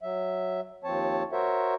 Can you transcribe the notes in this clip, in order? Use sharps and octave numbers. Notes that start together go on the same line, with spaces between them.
F#3 E5
D#2 F3 C4 C#5 A5
F#4 A#4 C5 C#5 E5